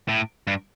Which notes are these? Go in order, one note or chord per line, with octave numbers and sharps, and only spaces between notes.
A2
G2